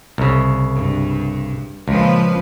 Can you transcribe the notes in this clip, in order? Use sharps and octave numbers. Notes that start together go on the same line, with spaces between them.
C2 C#3
G2
C#2 A#2 F3 B4